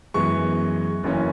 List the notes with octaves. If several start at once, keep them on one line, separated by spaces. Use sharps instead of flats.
F#2 E3 G#3 B3 C#6
F#1 F#2 E3 A#3 C#4